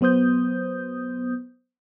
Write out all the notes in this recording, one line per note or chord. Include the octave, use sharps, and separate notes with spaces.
F#3 B3 C5 D#6 G6